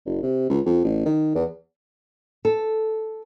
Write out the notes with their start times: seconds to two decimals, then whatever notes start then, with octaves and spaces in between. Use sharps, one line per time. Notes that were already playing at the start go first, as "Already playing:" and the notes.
0.06 F#1
0.22 C3
0.50 C#2
0.66 F2
0.84 A1
1.05 D#3
1.35 E2
2.45 A4